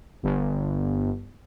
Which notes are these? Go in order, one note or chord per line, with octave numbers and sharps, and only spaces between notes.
G1